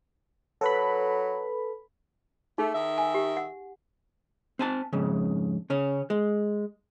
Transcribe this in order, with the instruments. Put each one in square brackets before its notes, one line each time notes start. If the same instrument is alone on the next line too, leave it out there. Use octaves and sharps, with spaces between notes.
[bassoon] F#3 [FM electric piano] A4 B4 B5
[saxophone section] A3 [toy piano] D#4 G#4 A4
[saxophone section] D#3 E5
[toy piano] G#5
G4
F#5
[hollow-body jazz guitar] C4 G#5 A5
F2 G#2 C#3
C#3 C#4
G#3